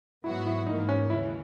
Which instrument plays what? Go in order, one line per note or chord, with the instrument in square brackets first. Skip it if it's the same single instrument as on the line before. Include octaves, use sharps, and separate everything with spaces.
[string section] G#2 F#3 B3 F#4 [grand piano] E4
[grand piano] E4
[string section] G#2 E3 A#3 [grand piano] D#4
[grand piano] C#4
[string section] D#2 C#3 E3 [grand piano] E4